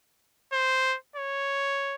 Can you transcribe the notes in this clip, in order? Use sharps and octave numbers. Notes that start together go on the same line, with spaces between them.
C5
C#5